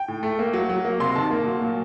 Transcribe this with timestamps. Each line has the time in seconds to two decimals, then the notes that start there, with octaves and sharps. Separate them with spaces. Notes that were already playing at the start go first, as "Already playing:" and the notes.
Already playing: G5
0.08 A2
0.23 A3
0.39 A#3
0.53 F#3
0.70 F#3
0.85 A#3
1.00 C3 C6
1.16 D#3 A5
1.31 A#3
1.47 F#3
1.61 A#2